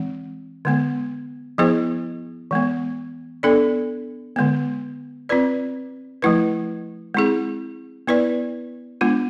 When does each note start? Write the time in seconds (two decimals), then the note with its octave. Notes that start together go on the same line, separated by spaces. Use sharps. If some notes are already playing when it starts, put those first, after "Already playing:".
Already playing: E3 G#3 C4
0.65 D3 G#3 B3
1.58 F3 B3 E4 G#4 C5
2.51 E3 G#3 B3
3.43 B3 D4 A4 D5
4.36 D3 G#3 B3
5.29 C4 F4 B4 D5
6.22 F3 A3 E4 B4
7.14 G#3 C4 E4 G#4
8.07 B3 E4 B4 D5
9.01 G#3 B3 D4 F4